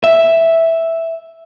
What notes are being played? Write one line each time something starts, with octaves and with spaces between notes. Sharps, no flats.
E5